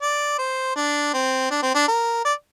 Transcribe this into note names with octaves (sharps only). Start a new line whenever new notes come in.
D5
C5
D4
C4
D4
C4
D4
A#4
D5